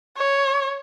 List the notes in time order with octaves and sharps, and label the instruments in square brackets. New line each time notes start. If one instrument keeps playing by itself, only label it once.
[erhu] C#5